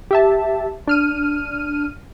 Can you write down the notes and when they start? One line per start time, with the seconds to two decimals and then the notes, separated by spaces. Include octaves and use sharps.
0.11 G4 E5 A5
0.87 D4 F6 D#7